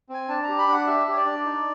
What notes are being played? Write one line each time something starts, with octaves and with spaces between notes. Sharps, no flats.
C4 G#5
D4 A5
A#5
G4
B5
D4 F#5
G4 E5
G4
C#5
D5
D4
D#4